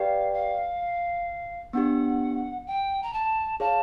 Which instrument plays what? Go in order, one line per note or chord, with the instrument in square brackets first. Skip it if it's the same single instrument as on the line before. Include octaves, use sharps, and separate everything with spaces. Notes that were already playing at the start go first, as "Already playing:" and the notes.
Already playing: [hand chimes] G4 B4 D5 G5 [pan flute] F5
[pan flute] F5
[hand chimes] B3 D4 G4 [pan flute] F#5
[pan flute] G5
A#5
A5
[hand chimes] G#4 C#5 F5 [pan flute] A5